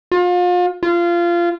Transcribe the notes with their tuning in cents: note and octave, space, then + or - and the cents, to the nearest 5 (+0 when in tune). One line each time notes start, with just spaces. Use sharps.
F4 +35
F4 -20